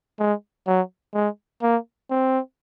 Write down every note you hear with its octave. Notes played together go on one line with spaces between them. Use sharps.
G#3
F#3
G#3
A#3
C4